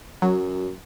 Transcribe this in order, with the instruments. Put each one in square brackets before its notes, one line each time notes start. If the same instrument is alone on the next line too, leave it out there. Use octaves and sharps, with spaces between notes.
[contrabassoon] F#2 [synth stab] F#3